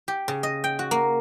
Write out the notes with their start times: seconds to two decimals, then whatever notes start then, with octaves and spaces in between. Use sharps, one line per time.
0.08 G4
0.28 C#3
0.43 D#5
0.64 G5
0.79 F#4
0.91 A#3